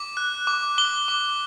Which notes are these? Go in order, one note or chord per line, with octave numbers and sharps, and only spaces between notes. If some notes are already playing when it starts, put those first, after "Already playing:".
Already playing: D6
F#6
D6
D6 G7
D6